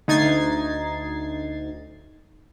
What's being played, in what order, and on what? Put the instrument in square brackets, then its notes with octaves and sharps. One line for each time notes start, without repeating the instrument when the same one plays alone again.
[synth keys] D2 D#4 G#6 A6 C7